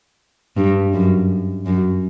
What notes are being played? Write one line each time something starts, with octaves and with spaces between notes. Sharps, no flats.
G2
F#2
F#2